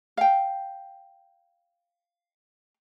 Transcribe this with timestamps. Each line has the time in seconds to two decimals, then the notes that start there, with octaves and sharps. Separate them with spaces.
0.17 F5 G5